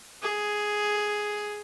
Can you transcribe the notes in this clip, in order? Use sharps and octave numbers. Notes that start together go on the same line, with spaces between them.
G#4